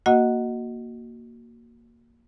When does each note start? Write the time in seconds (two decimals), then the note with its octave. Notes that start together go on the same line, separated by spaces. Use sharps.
0.06 A#3 F#4 D#5 F#5